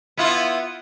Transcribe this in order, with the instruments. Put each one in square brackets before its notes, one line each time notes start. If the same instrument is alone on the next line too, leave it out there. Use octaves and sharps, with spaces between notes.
[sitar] B3 E4 F4